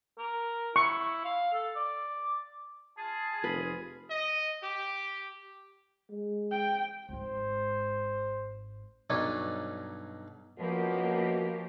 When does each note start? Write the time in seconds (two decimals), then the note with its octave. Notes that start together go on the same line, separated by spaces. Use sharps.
0.19 A#4
0.76 E4 C#6
1.25 F5
1.53 A4
1.76 D5
2.98 F4 G#4 A5
3.44 F1 B4
4.11 D#5
4.64 G4
6.10 G#3
6.51 G5
7.09 G#1 G#2 C5
9.10 B1 G2 D#4 C#5 D5
10.58 F#2 B2 F3 A#3 G4